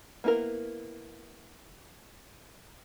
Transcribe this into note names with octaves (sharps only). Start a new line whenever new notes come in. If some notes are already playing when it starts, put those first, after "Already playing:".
A#3 B3 E4 A4 A#4